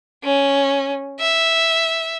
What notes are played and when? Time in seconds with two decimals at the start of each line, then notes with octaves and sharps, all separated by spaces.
0.24 C#4
1.20 E5